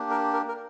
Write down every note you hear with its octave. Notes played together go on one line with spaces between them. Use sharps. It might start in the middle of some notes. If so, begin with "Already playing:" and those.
Already playing: A#3 D4 G4
A#4
A#4
A#4